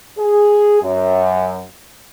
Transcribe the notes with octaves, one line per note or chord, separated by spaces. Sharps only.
G#4
F#2